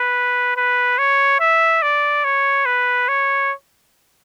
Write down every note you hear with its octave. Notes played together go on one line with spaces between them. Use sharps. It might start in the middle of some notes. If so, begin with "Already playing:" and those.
Already playing: B4
B4
C#5
E5
D5
C#5
B4
C#5